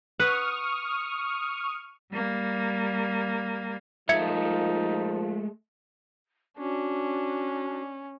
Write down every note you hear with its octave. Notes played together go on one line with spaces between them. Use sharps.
B4 F#5 C#6 D#6 F6
G3 A#3
A#2 F3 G#3 A3 D#4 E5 G#6 C#7
C#4 D4 F#4